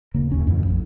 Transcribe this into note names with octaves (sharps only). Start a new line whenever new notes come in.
D#1 C#3 A#3
D#2 C#4
F2 A2 C#3 E3
A1 F2